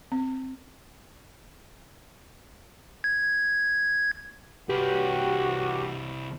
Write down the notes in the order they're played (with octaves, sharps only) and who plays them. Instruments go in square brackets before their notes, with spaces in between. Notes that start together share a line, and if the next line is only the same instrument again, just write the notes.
[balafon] C4
[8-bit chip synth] G#6
[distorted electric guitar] C2 B4 [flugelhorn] F#4 [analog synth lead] G4